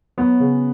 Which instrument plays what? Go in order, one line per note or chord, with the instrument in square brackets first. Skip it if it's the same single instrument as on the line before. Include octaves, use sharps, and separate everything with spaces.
[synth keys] F#3 [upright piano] B3
[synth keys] C#3